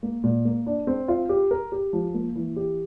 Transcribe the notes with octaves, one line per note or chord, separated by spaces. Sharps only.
A#3
A#2
A#3
D4
C4
F4
G4
A#4
G4
F3
A#3
E3
G4